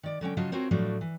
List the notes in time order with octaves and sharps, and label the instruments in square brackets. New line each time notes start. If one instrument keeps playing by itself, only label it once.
[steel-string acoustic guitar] D#3 D5
D3 F#3 C#4 G5
C#3 F#3 F4 D#5 A5
C4 F4 F#4 A#4 C5 C#5
A2 F3 F#3 A3 D4 F4
E3